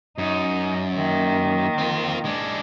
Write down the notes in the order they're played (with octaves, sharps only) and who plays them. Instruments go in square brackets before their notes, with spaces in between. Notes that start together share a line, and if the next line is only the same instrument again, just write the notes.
[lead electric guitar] F#2 [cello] D#4
[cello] D#3 A#3
[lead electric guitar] C4 F4
G#3 D4